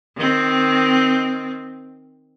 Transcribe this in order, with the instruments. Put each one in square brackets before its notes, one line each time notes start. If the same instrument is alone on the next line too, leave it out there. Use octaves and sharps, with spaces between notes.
[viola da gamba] D#3 C4